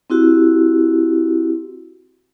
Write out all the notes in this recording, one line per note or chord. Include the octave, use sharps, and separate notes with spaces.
C4 E4 F#4 G4